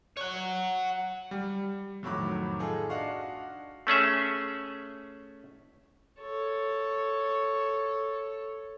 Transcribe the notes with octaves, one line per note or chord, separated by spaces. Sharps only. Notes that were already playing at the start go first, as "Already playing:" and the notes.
C#5 F#5
G3
F2 A2 D#3 F#3 B5 D6
D#4 F4 G#4 A4
D4 F#4 D#5 F5 F#5 C#6
A3 C#4 G#4 E5
A4 C#5